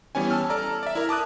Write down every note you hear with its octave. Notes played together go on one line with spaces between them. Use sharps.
E3 G3 B3 C#4 G#5
A5 E6 F6
A4 D5 A#5
D5 E5
E4 A#4
A5 D6 D#6 F#6